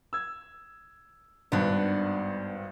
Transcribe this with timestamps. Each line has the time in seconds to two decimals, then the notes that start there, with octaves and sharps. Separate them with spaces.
0.13 E6 G#6
1.52 G#1 G2 B3 D4